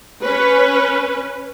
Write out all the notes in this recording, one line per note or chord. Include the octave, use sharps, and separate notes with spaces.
C#4 B4